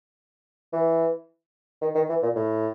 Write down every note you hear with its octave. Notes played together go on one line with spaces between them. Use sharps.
E3
D#3
D#3
E3
A#2
A2